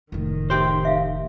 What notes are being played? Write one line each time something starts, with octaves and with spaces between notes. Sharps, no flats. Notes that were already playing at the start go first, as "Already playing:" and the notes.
F1 A2 D#3
G4 C5
E5 F5